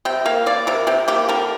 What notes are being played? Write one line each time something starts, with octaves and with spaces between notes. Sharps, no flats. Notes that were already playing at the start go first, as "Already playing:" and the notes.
C3 G5
A#3 F5
A#3 D5
C3 A#4
C3 G4
A#3 G4
D3 A#4